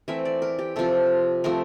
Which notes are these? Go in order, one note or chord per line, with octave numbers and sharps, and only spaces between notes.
E3 A3 C4 E5
D5
A#4
G4
C3 F3 C4 A4
F3 A3 C4 A#4